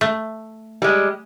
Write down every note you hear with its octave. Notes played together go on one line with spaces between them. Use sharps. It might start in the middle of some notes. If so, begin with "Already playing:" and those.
A3
G3 G#3